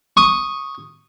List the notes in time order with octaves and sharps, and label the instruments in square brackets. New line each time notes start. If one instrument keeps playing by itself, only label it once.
[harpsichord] C#6 D#6